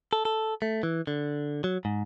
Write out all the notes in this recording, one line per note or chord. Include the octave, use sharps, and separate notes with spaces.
A4
A4
A3
E3
D3
F#3
G#2